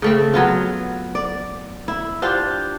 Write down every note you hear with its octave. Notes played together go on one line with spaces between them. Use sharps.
C#3 A3 C4
F#3 B3 F4
D5
E4
D4 F4 G4 C5